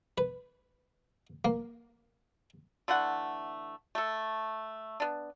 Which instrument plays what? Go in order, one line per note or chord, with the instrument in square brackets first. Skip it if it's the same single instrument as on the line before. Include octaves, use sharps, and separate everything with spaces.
[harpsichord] B4
A#3
[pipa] D3 E3 A3 F#5
A3 A4
B3 D4